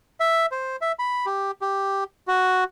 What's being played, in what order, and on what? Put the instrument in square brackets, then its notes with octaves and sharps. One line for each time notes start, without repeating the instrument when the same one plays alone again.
[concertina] E5
C5
E5
B5
G4
G4
F#4